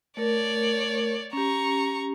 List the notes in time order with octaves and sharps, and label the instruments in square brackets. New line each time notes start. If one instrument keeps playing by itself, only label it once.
[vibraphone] A3 A#4 [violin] C#5 D5
[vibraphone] C#4 G4 [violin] A#5 C#6